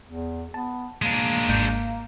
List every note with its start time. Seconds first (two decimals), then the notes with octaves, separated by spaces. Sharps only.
0.08 E2
0.54 B3 A5
1.02 G#3 A#3 D4
1.49 G#1 G#2 G6